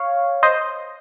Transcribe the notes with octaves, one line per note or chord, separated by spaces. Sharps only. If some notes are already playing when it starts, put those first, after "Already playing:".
Already playing: C#5 F5
C5 D#5